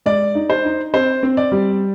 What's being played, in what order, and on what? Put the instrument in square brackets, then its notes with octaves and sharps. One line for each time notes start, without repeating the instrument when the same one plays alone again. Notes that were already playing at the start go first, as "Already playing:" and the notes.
[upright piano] G#3 [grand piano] D5
[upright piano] D#4
[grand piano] C5
[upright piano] D#4
[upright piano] C4 [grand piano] C5
[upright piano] C4
[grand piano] D5
[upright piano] G3